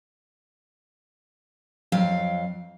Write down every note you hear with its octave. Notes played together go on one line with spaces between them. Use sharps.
F2 F#3 F5 G5